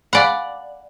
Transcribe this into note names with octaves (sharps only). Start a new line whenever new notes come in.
D5 F5 F#5 G#5 B5